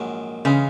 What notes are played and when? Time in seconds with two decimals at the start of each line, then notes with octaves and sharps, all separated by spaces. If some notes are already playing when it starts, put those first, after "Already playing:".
Already playing: A#1 G#2 D#3 F#3
0.45 C#3 E3 G#3 C#4